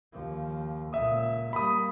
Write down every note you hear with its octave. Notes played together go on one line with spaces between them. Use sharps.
D#2 F3
C#2 A#2 E5 D#6
G3 A#3 B5 D#6